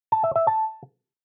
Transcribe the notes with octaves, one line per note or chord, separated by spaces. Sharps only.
A5
E5
E5
A5